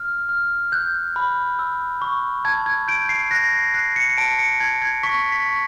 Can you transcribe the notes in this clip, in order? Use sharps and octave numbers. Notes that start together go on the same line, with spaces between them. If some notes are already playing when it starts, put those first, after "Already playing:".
Already playing: F6
F6
F#6 G6
B5
E6
C#6
A5 G#6
G#6
G6 D7
C7
F#6 A#6
C7
F#6 C7
C#7
C#7
A5 D7
C#7
A5 G#6
G#6
C#6 B6
B6
C#6